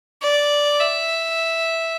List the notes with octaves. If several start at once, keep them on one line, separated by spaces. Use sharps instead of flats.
D5
E5